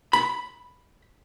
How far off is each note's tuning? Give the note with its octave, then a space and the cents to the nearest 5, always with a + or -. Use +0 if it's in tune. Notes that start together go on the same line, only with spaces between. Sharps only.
B5 +0